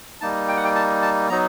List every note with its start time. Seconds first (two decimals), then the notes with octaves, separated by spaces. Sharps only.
0.21 G3 A#3 D#4 A5
0.49 G5
0.56 F#5
0.64 G5
0.75 A5
1.02 A5
1.29 F#3 B3 D#4 A#5